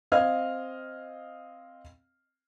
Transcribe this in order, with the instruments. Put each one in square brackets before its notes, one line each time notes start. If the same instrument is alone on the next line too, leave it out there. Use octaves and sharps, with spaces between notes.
[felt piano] C4 D#5 F5 F6 G#6